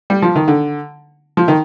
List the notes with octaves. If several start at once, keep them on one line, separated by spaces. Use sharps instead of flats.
G3
F3
D#3
D3
F3
D#3